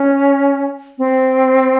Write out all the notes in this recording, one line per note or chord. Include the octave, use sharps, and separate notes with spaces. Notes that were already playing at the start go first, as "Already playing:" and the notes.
Already playing: C#4
C4